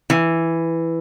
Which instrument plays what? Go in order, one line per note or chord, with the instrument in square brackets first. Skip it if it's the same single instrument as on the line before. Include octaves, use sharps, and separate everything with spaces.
[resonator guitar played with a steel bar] E3